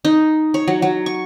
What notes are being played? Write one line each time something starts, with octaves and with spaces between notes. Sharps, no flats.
D#4
C#5
F#3
F#3
C#6